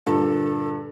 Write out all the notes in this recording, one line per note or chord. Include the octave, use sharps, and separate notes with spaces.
G2 A#2 D3 A4